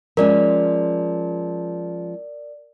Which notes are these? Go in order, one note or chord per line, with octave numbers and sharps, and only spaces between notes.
F3 G#3 C#4 A#4 D5